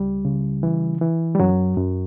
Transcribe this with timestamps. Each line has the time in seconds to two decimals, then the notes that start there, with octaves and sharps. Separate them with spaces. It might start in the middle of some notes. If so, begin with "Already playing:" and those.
Already playing: C#2 G3
0.25 C#3
0.63 E3
1.01 E3
1.35 G3
1.40 F#2 F#3
1.77 F#2